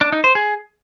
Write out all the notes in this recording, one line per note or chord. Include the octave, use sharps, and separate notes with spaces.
D4
D#4
C5
G#4